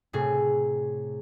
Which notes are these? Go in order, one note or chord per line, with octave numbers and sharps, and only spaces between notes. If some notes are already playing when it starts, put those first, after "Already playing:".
A2 C3 G#4